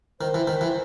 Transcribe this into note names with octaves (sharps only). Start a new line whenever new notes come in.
D#3 C5
E3
D#3
E3